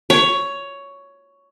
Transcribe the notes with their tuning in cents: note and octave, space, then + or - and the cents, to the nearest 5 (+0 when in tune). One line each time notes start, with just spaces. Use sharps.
C#5 +10